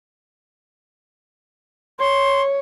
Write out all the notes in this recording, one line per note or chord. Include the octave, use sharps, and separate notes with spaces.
C#5 C6